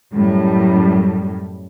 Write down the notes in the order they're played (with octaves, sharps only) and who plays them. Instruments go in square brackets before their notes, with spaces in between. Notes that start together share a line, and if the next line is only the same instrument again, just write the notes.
[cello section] F#2 A2 G3